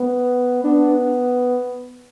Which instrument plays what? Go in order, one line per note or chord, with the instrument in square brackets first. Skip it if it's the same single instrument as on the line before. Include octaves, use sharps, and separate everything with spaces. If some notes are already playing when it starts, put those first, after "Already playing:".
Already playing: [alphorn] B3
[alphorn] B3 [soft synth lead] D4